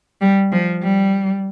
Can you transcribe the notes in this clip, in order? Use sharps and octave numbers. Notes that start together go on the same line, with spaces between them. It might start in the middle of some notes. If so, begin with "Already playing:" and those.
G3
F3
G3